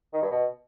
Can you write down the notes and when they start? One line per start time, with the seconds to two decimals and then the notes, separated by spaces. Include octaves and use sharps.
0.13 D#3
0.22 G2
0.31 B2